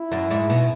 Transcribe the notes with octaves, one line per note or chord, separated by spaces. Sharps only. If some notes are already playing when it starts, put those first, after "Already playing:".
Already playing: E4
F#2
G#2
B2